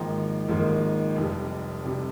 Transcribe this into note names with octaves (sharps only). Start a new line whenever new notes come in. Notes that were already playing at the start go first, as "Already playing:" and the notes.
Already playing: G#1 G#2 F3 A#3 G5 A#5
G#1 G#2 F3 A#3
F1 F2 C3 G3
C3 G3